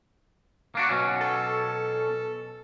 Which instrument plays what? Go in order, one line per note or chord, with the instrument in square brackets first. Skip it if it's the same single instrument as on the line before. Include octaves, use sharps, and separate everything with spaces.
[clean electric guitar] A#3 D4 F#4
B2 F#3 C#4
[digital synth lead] A4